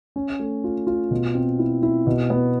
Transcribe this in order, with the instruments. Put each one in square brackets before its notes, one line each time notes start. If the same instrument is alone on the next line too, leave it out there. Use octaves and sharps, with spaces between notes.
[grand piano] C#4
A3
F4
F4
B2
C4
E4
E4
B2
B3